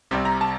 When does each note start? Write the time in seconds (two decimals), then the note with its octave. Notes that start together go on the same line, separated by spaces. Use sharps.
0.11 C2 C3 G3 C4
0.25 A#5
0.41 A5